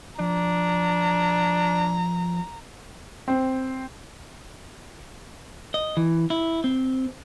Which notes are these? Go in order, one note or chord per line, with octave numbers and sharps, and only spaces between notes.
F3 D4 A#5
C4
D#5
E3
E4
C4